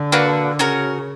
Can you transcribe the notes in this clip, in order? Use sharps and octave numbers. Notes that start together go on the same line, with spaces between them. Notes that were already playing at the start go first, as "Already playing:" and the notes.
Already playing: D3
A#3 D4 F#4 B4
C#3 C#4 F#4 A#4